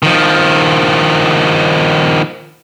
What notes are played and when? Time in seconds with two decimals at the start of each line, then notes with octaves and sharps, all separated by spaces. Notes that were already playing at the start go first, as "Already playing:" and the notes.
0.03 D#3 F3